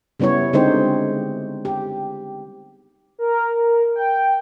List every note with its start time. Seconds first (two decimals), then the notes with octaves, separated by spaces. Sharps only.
0.20 C#3 G3 B3 E4 C#5
0.53 D3 G#3 C4 D#4 G4 C5
1.65 G4
3.19 A#4
3.96 G5